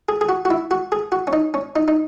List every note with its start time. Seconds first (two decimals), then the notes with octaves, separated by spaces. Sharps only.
0.09 G#4
0.21 G#4
0.29 F#4
0.45 F#4
0.50 E4
0.71 F#4
0.92 G#4
1.12 F#4
1.27 C#4
1.33 D#4
1.54 C#4
1.76 D#4
1.88 D#4